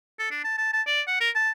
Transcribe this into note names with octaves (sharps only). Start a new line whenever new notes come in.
A4
D4
A5
A5
A5
D5
F#5
A#4
A5